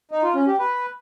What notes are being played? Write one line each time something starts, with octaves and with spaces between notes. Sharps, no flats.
D#4
F4
C#4
G4
B4